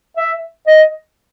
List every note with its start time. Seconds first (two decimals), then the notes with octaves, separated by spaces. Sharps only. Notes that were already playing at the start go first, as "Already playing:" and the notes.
0.17 E5
0.67 D#5